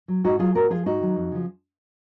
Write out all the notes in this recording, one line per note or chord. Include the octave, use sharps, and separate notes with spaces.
F#3
G#2 D#4 F#4
F#3 F4 G#4
A#2 F#4 A#4
F3 F4 G#4
G#2 D#4 F#4
D#3 F#3
F2
C#3 F3